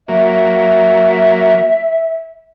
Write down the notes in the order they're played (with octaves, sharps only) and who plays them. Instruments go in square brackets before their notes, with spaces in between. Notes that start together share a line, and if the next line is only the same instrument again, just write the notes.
[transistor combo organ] F#3 A#3 [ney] E5